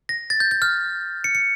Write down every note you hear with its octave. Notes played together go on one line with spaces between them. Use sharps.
A#6
A6
G6
G6
F6
C#7
C#7